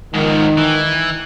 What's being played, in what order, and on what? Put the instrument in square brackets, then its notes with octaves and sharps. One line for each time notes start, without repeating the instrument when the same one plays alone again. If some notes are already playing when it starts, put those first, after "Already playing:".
[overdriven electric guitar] G#2 F3 [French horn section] D#3
[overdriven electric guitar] E3